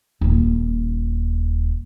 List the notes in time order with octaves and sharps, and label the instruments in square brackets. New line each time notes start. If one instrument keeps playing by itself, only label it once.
[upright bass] D#1 F4